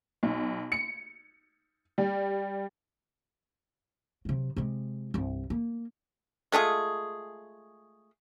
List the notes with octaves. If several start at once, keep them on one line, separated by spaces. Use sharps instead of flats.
B1
C#7
G3
C3 F#3
C3 G#3
C2 G2
A#3
G#3 A3 F4 G#4